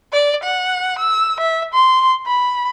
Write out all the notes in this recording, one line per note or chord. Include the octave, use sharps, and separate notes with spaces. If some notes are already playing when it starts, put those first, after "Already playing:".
D5
F#5
E6
E5
C6
B5